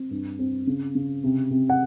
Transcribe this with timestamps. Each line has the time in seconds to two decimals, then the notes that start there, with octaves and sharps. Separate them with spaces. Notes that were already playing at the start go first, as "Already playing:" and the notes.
Already playing: C4
0.11 G2
0.39 C4
0.67 C#3
0.95 C#3
1.24 C3
1.51 C3
1.69 F#5